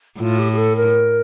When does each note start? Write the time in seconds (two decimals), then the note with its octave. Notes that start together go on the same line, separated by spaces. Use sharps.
0.19 A2 F4
0.39 G4
0.52 G4
0.57 A4
0.76 A#4